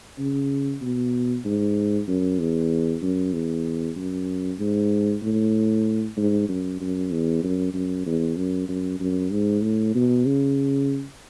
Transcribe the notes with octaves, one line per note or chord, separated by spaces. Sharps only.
C#3
B2
G#2
F#2
E2
F#2
E2
F#2
G#2
A2
G#2
F#2
F#2
E2
F#2
F#2
E2
F#2
F#2
F#2
G#2
A2
B2
C#3